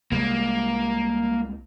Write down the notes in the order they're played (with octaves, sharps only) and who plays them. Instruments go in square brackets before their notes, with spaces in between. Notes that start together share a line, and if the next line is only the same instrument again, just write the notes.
[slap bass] C2 G3 G#3 [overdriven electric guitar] A#3